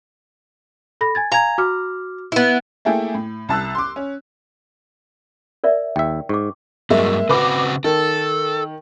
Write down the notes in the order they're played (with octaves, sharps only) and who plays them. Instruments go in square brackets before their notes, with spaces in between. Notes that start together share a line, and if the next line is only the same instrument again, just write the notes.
[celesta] A4 B5 A#6
G#5 G#6 A6
[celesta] F5 G#5 G#6 [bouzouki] A#5
[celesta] F#4 D6 F6
[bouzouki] B3 E4
[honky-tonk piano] A3 A#3 E4 G#4 A4 G5
A2
C2 A5 E6 F#6
C6 D6
C#4
[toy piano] A#4 D5 E5
[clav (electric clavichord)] D#2 E5 [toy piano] G5
[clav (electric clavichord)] G#2 [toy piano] C#6 D6
[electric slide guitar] G2 F#3 [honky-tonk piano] G#3 A#3 E5
[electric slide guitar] C#3 C4 F#4 [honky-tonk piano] B4 D6
[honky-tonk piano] D#3 [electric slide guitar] A4